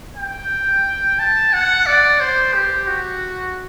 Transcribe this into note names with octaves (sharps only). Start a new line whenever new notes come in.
G5
A5
F#5
D5
C5
G4
F#4